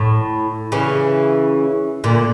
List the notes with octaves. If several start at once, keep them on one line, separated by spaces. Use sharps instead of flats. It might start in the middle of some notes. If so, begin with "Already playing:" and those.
Already playing: A2
C#3 E3
A#2 D3